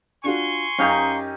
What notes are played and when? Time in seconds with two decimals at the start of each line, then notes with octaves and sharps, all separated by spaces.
0.24 D4 F4 F#4 G#5 C6 C#6
0.79 F#2 C#4 D#4 G4 F5 A#5